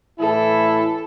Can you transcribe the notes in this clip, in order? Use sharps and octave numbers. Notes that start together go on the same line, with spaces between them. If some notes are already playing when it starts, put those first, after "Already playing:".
A2 E3 E4 A4